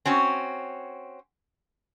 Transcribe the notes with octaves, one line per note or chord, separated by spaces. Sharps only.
C4 C#4 F#4